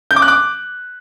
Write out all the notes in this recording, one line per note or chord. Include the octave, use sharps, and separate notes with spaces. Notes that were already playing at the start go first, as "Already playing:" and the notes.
G6
D6
F#6
D6